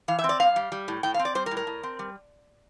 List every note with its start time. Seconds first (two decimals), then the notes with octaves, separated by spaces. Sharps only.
0.08 E3 F5
0.19 E5
0.24 C4
0.29 D5
0.40 G2 F5
0.56 G3
0.72 G3
0.88 A2
1.03 A2 G5
1.14 F5
1.19 C4
1.25 D5
1.35 G3 C5
1.46 A#4
1.51 A2
1.57 A#4
1.67 A2
1.83 C4
1.99 G3